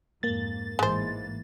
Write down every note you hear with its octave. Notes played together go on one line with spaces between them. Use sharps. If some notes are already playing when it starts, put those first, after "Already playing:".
F2 G#2 A#3 A6
A1 G#2 E3 G#3 C5